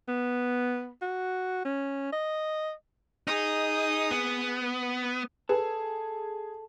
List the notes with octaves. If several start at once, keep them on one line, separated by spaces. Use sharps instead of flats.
B3
F#4
C#4
D#5
D#4 G#4 D#6
B3
G#4 A4 B4